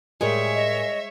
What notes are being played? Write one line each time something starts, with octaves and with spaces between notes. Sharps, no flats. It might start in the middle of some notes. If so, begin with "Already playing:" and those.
A2 G3 G#3 A#4 C#5 E5 G#5
D#5